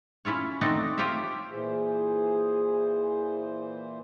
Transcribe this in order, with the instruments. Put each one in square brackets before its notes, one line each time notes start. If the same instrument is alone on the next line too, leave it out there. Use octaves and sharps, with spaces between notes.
[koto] C#4 E4 F4 C#5
A3 C4 D4 D#4 F#4 A4
F4 G4 C5 C#5 E5
[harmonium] A#2 E3 C5 [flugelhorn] G#4